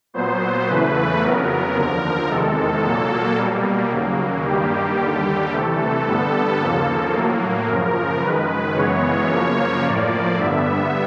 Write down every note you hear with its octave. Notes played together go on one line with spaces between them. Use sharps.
A#2 F#3 B3 C5
E2 C#3 E3 A3 B4
F2 C#3 F#3 B3 A#4
D#2 D3 F3
E2 C3 D#3 G#3 A4
A#2 F#3 A#3
B2 G3 A#3
D#2 C#3 F#3 A#3
G2 D#3 G3 A#3 G4
D#2 D3 G3
C3 E3 A3 A4
G2 D3 G3 B3
D#2 C#3 F3 A#3
A2 F#3 A#3
F#2 C#3 F3 A#4
F#2 D#3 G#3 B4
F#2 C#3 E3 G#3 B3 C#5
F#2 C#3 F3 A#3
A2 F3 A#3 D5
G2 D3 G3 B3 E5